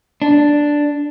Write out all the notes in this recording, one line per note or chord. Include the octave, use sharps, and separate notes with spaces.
D4